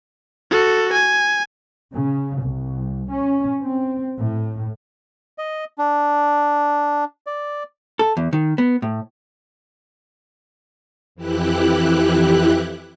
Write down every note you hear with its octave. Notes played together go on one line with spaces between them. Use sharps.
F#4 A4
G#5
C#3
C2
C#4
C4
A2
D#5
D4
D5
A4
E2
D#3
B3
A2
F2 E3 E4 G4 F#6